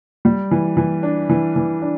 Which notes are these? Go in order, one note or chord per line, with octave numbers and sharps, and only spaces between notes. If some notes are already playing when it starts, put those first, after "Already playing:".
G3
E3
E3
D4
E3
E3
D4